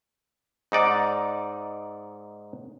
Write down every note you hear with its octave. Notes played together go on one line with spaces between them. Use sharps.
G#2 D#4 D5 F#5